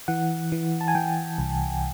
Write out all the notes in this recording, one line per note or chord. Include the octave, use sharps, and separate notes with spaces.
E3 F#5
E3
A5
G#5
E3 G5
C2